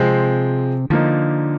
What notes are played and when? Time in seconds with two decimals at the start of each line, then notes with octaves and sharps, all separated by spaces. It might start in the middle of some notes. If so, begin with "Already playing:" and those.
Already playing: C3 F3 G#3 C4
0.90 D3 F3 A#3 D#4